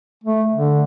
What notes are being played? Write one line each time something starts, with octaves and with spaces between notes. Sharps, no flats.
A3
D3